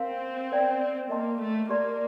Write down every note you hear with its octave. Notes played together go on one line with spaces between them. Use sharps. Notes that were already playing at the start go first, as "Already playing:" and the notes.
Already playing: C4 A#4 F5 A#5
A#4 D5 G5 A#5
A#3 A#4 D#5 A5 C6
A3
A#3 G4 D5 A5 C6